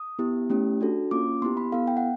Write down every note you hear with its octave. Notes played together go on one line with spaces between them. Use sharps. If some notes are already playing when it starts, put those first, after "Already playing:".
Already playing: D#6
B3 E4 G4
A3 C#4 E4 G4
D4 F#4 A4
A#3 C#4 F4 D6
B3 E4 G4 C6
B5
B3 E4 A4 F5
G5
F#5